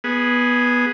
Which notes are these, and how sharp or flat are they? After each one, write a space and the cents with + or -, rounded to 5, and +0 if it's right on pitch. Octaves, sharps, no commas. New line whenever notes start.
B3 -10 G#4 +0